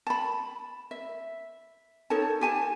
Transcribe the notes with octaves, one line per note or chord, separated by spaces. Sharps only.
A5 B5
E5
D#4 A4 C#5 A5
G4 G#5 A5